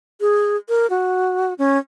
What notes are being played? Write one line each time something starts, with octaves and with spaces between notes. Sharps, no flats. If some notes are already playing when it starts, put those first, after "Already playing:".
G#4
A#4
F#4
C#4